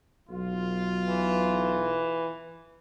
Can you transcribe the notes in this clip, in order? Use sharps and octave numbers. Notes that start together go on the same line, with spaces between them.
B1 F4
E3